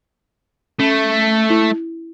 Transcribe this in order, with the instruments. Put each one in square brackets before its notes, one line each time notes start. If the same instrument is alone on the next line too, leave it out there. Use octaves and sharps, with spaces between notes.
[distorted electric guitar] A3 [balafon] C#4
[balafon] E4